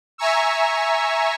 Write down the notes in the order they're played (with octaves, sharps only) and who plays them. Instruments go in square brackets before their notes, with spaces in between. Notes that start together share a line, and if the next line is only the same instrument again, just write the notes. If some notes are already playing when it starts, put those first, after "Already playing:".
[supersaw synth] E5 G#5 A#5 C#6 E6